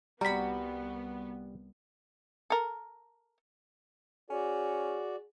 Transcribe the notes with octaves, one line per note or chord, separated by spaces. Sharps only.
C2 G3 B3 F#4 A#5 B5 B6
A4 A#4
C#4 F#4 G#4 D5